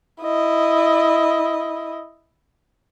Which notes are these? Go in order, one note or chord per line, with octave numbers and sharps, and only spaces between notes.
E4 D#5